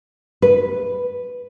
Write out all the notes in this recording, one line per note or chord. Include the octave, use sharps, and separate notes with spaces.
B4